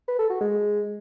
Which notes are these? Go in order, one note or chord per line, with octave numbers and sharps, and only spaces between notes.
B4
A4
F#4
G#3